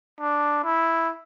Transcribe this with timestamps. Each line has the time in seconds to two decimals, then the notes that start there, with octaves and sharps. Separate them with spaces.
0.20 D4
0.64 E4